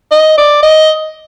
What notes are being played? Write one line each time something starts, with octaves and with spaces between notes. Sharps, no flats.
D#5
D5
D#5